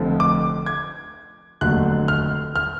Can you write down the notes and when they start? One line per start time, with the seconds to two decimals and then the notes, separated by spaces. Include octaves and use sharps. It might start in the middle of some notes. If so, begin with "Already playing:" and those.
Already playing: F1 F2 D3 F3
0.20 D6
0.66 G#6
1.61 F1 D#2 D3 F#3 F#6
2.08 F6
2.56 F6